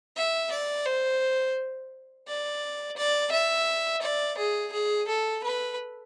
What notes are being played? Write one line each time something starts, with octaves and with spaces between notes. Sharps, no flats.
E5
D5
C5
D5
D5
E5
D5
G#4
G#4
A4
B4